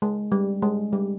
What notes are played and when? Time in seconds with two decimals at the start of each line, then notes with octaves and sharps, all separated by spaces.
0.02 G#3
0.32 G3
0.62 G#3
0.93 G3